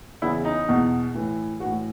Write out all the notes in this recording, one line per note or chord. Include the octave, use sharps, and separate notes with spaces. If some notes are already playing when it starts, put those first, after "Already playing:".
E2 C#3 E3 E4
D#4
E2 B2
A2 E3
E3 F#4
A2